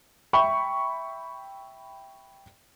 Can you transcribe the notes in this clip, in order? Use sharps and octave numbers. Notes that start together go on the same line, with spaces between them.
E5 G5 B5 C#6